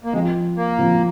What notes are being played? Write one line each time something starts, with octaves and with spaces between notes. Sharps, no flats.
A#3
F3 G#3 C4 F4
A#3
F3 C4 F4